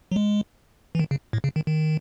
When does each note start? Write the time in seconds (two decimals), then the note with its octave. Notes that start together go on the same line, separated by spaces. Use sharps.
0.12 F#3
0.16 G#3
0.95 E3
0.99 D#3
1.11 C#3
1.33 A2
1.44 C#3
1.56 D#3
1.67 D#3